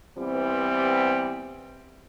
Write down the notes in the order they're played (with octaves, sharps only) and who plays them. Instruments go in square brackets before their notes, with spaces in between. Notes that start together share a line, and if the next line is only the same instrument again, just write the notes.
[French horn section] E3 G3 B3 C4